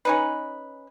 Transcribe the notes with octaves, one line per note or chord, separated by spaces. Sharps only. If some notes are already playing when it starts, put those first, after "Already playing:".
C#4 D#4 B4